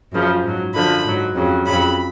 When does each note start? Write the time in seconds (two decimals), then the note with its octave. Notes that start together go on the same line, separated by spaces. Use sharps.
0.13 F#2 C#3 F3
0.44 G#2 F#3
0.74 F#2 D3 F3 B5
1.04 G#2 F#3
1.35 F2 C#3 F#3
1.66 F2 C#3 F#3 B5